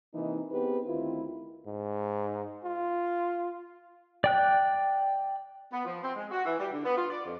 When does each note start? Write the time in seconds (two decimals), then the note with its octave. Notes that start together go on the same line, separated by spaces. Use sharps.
0.14 C3 E3 A#3 D#4
0.52 B3 C4 D#4 G4 G#4 B4
0.86 D2 D#3 C4 E4 F4
1.67 G#2
2.64 F4
4.24 D5 G5 F#6
5.72 B3
5.85 F3
6.02 C4
6.15 G#3
6.31 F#4
6.45 E3
6.59 G3
6.73 D3
6.85 B3
6.97 F4
7.10 D5
7.25 F2